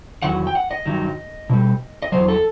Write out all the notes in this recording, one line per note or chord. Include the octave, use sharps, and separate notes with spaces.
E2 D#3 F#3 F#5
G5
F#5
D#5
G2 D#3 F#3
B2 G3
D#5
E2 B2 F#3 C5
A4